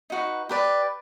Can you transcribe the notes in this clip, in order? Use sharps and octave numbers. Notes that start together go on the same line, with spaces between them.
D#4 F#4 B4
G4 B4 D5